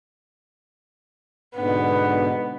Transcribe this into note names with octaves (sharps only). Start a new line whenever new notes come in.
G#2 B2 D3 B3